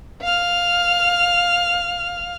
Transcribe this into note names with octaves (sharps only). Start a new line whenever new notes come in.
F5 F6